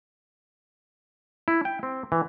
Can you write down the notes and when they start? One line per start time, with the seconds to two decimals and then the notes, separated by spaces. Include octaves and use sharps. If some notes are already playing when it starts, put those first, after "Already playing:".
1.48 E4
1.65 G5
1.83 C4
2.12 E3